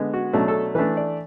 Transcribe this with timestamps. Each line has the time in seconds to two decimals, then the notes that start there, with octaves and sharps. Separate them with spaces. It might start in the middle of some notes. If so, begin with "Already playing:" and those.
Already playing: D3 G#3 B3
0.14 F#4
0.33 B2 F#3 A3 D4
0.48 A4
0.75 E3 A3 D4 B4
0.97 D5